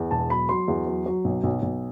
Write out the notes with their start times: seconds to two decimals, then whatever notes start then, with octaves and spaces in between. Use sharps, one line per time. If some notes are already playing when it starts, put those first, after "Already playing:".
Already playing: E2
0.11 E1 A5
0.30 F#3 B5
0.49 F#3 C6
0.68 E2
0.87 F#3
1.06 F#3
1.24 B1
1.43 B1
1.62 B1